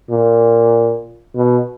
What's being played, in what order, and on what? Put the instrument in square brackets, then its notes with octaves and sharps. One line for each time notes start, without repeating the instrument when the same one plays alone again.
[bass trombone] A#2
B2